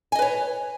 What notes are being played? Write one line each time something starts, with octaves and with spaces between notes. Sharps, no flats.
B4 C#5 D#5 G#5